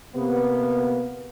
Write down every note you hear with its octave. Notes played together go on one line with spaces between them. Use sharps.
C3 A#3 B3